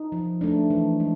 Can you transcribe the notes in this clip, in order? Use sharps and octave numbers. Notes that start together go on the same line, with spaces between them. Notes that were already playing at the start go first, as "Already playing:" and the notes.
Already playing: D#4
F3
A3 D4
E3
G#3